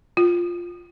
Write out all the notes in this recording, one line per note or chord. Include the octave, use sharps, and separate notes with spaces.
F4